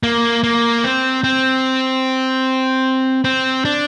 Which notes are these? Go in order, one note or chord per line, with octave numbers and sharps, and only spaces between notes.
A#3
A#3
C4
C4
C4
D4